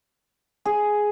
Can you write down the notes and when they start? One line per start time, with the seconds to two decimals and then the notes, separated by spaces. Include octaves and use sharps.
0.65 G#4